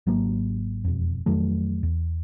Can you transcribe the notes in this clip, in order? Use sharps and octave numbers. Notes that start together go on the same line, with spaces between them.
G#1 F#3 A#3
E1 F2
F2 D#3 F#3 A3
E2